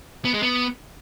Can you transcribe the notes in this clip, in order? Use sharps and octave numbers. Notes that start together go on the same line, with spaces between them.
B3
G#3
B3